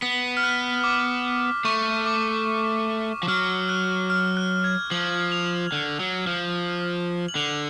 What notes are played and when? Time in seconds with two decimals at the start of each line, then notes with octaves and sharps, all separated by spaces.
0.02 B3 B6
0.37 F6
0.43 F#6
0.84 D6
1.65 A3 C#6
2.06 D6
3.23 F3
3.28 F#3 F6
3.69 F#6
4.10 F6
4.37 F#6
4.64 G#6
4.91 F3 F#7
5.32 F7
5.72 D3
6.00 F#3
6.27 F3
7.28 F#7
7.35 D3 F7